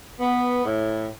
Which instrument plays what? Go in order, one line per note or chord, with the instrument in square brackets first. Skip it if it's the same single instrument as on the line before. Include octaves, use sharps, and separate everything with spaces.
[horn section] B3
A2